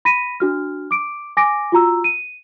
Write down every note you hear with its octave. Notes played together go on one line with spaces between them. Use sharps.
B5 A#6 B6 D#7
D4 F#4 F6
D6 D7
G#5 D6 A#6 D7
F4 F#4 A#5 E6
D#7